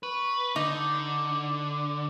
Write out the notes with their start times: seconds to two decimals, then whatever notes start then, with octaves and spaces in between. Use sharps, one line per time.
0.03 B4 C#6
0.56 D3 D#4 D6